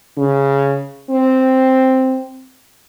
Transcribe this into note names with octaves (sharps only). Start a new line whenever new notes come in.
C#3
C4